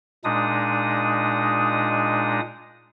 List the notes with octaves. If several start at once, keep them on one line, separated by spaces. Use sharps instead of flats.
A#2 G#3 D4 D#4 D#6